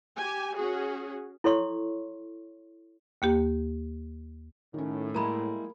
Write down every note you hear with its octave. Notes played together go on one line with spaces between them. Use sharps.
G4 G#5
C#4 F#4 G#4
E4 A4 C#5 C6 C#6
D#2 A#3 G4
A2 D#3 C#4
G3 G#3 A#3 E4 A#4 A#5 B5